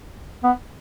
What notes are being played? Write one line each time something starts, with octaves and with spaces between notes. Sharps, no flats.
B3